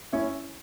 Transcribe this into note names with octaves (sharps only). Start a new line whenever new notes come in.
C#4 E4